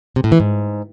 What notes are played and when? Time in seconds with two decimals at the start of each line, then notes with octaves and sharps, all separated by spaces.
0.16 C3
0.24 A2
0.32 E3
0.40 G#2